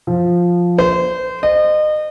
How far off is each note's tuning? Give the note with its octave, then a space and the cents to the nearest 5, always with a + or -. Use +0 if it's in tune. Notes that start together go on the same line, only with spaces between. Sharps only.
F3 +5
C5 -25
D#5 -30